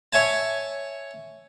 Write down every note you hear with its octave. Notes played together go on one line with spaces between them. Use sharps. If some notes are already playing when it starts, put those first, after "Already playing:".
C#5 E5 G#5 A5